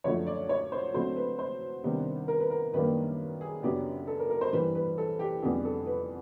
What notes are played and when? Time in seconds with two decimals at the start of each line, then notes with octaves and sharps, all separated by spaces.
0.04 F#2 D3 F3 A3 C#5
0.27 D5
0.49 C#5
0.72 C5
0.94 D3 F#3 A3 C4 C5
1.16 B4
1.39 C5
1.84 C3 D#3 G3 B3 D4
2.28 A#4
2.40 B4
2.50 A#4
2.73 F#2 D#3 G3 A#3 D4 B4
3.41 G#4
3.63 F#2 C#3 F#3 B3 D4 G4
4.07 A4
4.20 A#4
4.30 A#4
4.41 C5
4.53 G2 E3 G3 B4
4.75 B4
4.98 A4
5.19 G4
5.42 F2 D3 G3 B3 D4 G#4
5.65 A4
5.86 B4